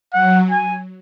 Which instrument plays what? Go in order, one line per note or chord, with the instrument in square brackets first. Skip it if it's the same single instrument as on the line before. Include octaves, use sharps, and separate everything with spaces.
[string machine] F#3 [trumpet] F#5
[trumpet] G#5